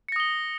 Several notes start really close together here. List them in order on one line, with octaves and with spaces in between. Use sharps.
C#7 A#6 D#6 G7